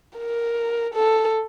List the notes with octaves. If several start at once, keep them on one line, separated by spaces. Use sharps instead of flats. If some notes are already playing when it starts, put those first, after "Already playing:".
A#4
A4